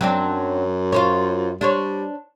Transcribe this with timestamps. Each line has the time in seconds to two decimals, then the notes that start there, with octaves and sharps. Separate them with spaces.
0.01 F#2 F#3 C4 D4
0.92 F4 C5 C#5
1.61 G3 D4 C5 C#5